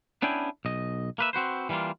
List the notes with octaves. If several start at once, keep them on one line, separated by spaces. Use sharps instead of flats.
B3 C#4 D4 E4 G5 G#5
B1 D#5
A#3 B4 E5
C4 F#4 B4 C5
E3 G3 A#3 D4 F4